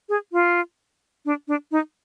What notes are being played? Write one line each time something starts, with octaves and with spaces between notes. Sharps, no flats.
G#4
F4
D4
D4
D#4